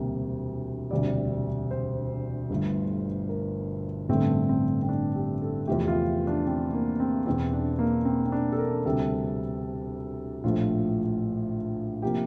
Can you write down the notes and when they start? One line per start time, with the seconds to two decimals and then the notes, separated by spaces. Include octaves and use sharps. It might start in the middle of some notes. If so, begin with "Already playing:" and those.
Already playing: E1 D2 C3 G3 A#3
0.91 E1 D2 C3 G3 D5
1.71 C5
2.50 G1 G2 D3 A3
3.29 A#4
4.09 A1 G2 D3 A3 C4
4.49 C4
4.82 C4
4.89 D4
5.15 G4
5.42 A4
5.67 E2 C3 F3 A3 G4
5.88 F4
6.27 D4
6.47 C4
6.73 A#3
7.00 C4
7.26 E1 E2 E3 C4
7.53 D4
7.79 A#3
8.05 C4
8.26 C4
8.32 D4
8.52 A4
8.59 A#4
8.85 D2 C3 G3 A4
10.44 A#1 A2 F3 A3 F4
12.02 C3 F3 A#3 G4